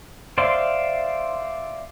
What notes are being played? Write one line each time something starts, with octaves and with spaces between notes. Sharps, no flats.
C5 D5 E5 F5 C6